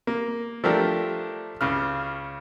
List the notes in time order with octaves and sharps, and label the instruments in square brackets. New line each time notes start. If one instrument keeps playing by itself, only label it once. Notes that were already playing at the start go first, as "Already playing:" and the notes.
[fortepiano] A#3
F3 A3 D4 G4 A#4
C#2 C#3 F6